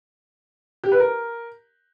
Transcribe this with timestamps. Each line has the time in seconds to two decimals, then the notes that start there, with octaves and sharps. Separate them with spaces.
0.84 G4
0.92 B4
1.00 A#4